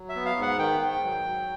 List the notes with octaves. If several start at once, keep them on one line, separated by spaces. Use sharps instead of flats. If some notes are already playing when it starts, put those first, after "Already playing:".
Already playing: F#3
E5
B3
F5
G#2 F#5
D#3 G5
G#2
F#3
F#3